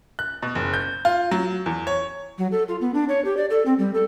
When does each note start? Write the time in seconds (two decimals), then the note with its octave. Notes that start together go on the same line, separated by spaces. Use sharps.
0.19 F#6
0.43 B2
0.55 F#1
0.74 G6
1.05 F4
1.31 F#3
1.66 E2
1.87 C#5
2.38 F#3
2.52 A4
2.68 F4
2.81 B3
2.94 D4
3.09 C#5
3.25 G4
3.37 D5
3.50 A4
3.66 C4
3.78 G3
3.94 A4